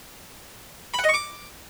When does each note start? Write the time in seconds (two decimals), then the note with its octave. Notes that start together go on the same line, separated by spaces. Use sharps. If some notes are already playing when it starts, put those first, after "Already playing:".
0.94 B5
0.99 F#5
1.04 D#5
1.09 C#6
1.14 D6